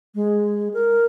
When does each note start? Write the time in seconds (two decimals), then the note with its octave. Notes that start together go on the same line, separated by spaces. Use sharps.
0.15 G#3
0.74 A#4